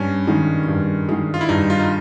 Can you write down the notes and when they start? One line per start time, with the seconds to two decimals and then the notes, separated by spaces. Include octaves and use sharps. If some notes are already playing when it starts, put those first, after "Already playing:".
Already playing: G2 C#4
0.27 D#3 G#3
0.68 G2
1.09 D#3 G#3
1.34 F4
1.41 E4
1.49 G2 D#4
1.70 F4
1.80 D#4